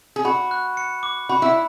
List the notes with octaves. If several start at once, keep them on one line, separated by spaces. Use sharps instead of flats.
G#4
F#4 B5
F#6
C#7
D6
F#4 B5
E4